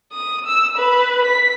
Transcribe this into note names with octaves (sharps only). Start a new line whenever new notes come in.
D#6
E6
B4
B6